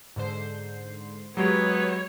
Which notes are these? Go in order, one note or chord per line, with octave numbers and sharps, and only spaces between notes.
G#2 D3 C5
F#3 G#3 B3 G4 C#5